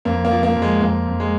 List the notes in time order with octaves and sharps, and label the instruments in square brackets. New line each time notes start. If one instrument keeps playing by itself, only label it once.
[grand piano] F2 A#3
A#3
F3
A#3
F2
G#3
F2 A#3
F2
G#3